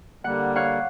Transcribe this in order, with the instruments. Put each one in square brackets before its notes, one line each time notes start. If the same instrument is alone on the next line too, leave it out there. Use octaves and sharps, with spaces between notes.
[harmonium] D3 G3 A#3 [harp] F#5
[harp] C#5 F5 F#5